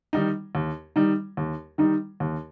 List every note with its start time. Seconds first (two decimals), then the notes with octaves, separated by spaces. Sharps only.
0.13 D#3 G3 D#4
0.55 D#2
0.96 D#3 G3 D#4
1.37 D#2
1.78 D#3 G3 D#4
2.20 D#2